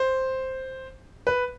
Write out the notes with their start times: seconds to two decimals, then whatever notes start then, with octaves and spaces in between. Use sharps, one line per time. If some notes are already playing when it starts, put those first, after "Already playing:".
Already playing: C5
1.27 B4